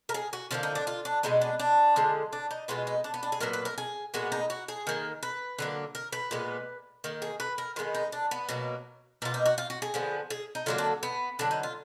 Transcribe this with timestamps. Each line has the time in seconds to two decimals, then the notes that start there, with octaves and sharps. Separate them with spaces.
0.09 A#4
0.14 G#4
0.33 F#4
0.51 D3 F3 A#3 F4
0.63 D#4
0.75 D4
0.87 F4
1.05 D4
1.23 B2 G#3 B3 D#4
1.41 D4
1.59 D4
1.96 D3 F3 G#3
2.33 D4
2.51 D#4
2.68 B2 G#3 B3 F4
2.87 D#4
3.04 D4
3.14 B3
3.23 D4
3.32 G#4
3.40 A#2 F#3 B3 A#4
3.53 B4
3.65 A#4
3.78 G#4
4.14 A#2 G#3 B3 F#4
4.32 D#4
4.50 F#4
4.68 G#4
4.87 D#3 A#3
5.23 B4
5.58 D3 F#3 A#3
5.95 A#4
6.12 B4
6.31 A#2 G#3 B3
7.04 D#3 A#3
7.22 G#4
7.40 B4
7.58 A#4
7.76 D#3 G#3 B3 F4
7.95 D#4
8.12 D4
8.31 B3
8.49 B2 F#3 A#3
9.22 B2 A#3 F4
9.34 D#4
9.46 F#4
9.58 F4
9.70 F#4
9.82 G#4
9.94 D3 F3 B3
10.30 G#4
10.55 D#4
10.66 D3 F#3 A#3 F4
10.78 D4
11.03 B3
11.39 D3 F#3 B3 D4
11.51 D#4
11.63 F4